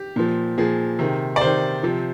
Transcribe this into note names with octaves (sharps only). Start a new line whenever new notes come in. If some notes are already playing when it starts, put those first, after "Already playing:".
Already playing: G4
A#2 F3
A#2 F3 G#4
C3 D#3
D5
C3 D#3 C5
C3 F3